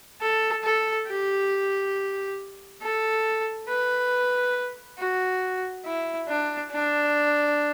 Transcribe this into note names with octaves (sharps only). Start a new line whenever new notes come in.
A4
A4
G4
A4
B4
F#4
E4
D4
D4